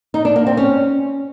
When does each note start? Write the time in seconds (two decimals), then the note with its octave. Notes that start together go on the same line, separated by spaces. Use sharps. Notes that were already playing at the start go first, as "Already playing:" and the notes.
0.14 D#4
0.25 D4
0.36 A#3
0.47 C4
0.57 C#4